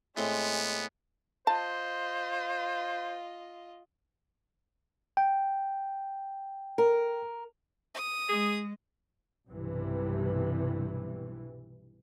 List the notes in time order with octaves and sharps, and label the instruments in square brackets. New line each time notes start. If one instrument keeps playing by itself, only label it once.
[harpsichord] A2 C4 [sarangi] G#3 [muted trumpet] B3
[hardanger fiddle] F4 D#5 [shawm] C5 [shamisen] A5
[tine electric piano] G5
[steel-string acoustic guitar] A#4
[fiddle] D#6
[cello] G#3 [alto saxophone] G#4
[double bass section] B1 G2 C3 E3